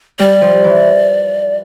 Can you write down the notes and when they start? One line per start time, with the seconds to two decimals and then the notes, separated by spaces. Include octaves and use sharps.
0.19 G3 D5
0.41 F3
0.64 E3